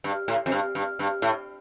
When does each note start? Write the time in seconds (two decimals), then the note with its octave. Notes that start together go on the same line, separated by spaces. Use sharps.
0.04 G2
0.28 A2
0.46 F2
0.52 G2
0.75 G2
0.99 G2
1.22 A2